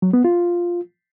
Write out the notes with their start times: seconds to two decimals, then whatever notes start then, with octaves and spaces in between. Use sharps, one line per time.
0.02 F#3
0.13 B3
0.24 F4